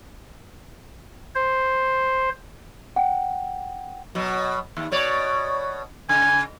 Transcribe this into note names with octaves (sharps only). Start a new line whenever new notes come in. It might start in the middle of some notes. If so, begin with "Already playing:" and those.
C5
F#5 G5
B2 F#3
D#2
B2 C#5 D5
C#3 G#5